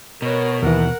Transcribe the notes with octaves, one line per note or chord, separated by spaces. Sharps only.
B2 A#4 C#5
D#2 E3 A#4 F#5